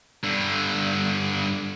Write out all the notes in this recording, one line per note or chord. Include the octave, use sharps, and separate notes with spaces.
G2 D3